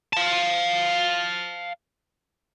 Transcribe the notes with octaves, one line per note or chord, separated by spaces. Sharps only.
F5 A5